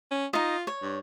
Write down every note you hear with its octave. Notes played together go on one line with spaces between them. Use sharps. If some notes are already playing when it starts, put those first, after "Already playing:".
C#4
D#4 F4 D#5
C#5
G2